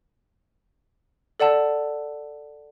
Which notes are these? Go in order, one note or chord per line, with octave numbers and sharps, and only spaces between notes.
A4 D5 F#5 A5 E6